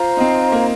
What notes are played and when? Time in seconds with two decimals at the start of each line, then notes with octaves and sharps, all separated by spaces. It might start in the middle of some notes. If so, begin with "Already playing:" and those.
Already playing: F4 C5 F5 A#5
0.17 D#4
0.21 C4
0.52 A#3